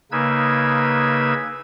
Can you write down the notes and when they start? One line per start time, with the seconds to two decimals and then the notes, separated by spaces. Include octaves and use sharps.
0.12 C#3 A#3 D#4 B4 E6 G#6